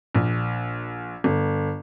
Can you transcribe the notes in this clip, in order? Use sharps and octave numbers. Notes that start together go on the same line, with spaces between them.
A#1
G1